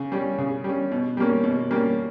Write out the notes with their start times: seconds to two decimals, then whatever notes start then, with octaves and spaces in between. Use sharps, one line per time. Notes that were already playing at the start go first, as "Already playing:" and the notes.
Already playing: C#3
0.12 G3 C#4
0.38 C#3
0.64 G3 C#4
0.91 B2
1.17 G3 A#3 C#4
1.44 B2
1.71 G3 A#3 C#4